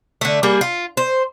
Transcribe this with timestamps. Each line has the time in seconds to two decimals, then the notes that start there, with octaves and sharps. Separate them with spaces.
0.21 D3 A3
0.43 G3 A#3 G#4
0.61 F4
0.97 C5